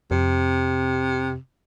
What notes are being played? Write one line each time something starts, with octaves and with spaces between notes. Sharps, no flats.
F2 C3